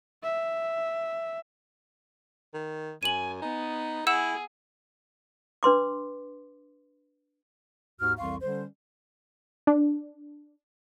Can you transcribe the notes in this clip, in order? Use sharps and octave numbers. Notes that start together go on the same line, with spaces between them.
E5
D#3
F#2 G#5 D#7 F#7
B3 D#4
E4 G#4 F#5 E6 E7
D4 B4 C6 D6
D#2 G#2 F#4 F6
C2 F2 E3 F5 C6 C#6
D3 G3 C#4 C5
D4